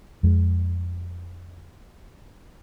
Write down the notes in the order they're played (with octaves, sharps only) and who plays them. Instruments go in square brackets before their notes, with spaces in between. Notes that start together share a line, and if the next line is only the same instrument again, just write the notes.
[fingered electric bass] F2 G#3